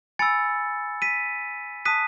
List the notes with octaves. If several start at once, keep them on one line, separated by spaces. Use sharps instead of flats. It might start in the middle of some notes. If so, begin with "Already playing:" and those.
G#5 B5 E6 A6 C#7
B6 D#7
A5 D#6 F#6 B6 D#7